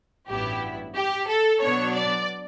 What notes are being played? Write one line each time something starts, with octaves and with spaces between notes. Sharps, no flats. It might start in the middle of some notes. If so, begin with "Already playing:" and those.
A1 G2 F#3 B3 E4 G4
G4
A4
B2 F#3 B3 D4 C#5
D5